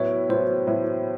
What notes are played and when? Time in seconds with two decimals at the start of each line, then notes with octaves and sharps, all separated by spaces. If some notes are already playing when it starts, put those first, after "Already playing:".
Already playing: A2 F#3 B3 E4 C#5
0.29 A2 F#3 B3 E4 C5
0.67 A2 F#3 B3 E4